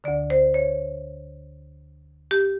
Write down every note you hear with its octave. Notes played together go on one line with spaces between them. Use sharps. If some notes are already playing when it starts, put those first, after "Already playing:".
D2 D3 D5
C5
C#5
G4